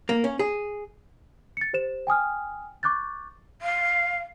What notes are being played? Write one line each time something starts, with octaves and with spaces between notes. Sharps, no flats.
A#3
C#4
G#4
A6 C#7
G4 C5 E7
G5 G#5 D#6 F6
C#6 D6 F#6 G6 A6
F5